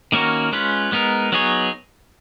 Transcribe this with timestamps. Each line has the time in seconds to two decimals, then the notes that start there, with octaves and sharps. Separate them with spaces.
0.12 D#3 A#3 C#4 F#4 A#4
0.52 G#3 C#4 F4 B4
0.92 G#3 B3 D#4 A#4
1.32 F#3 B3 D#4 G#4 C#5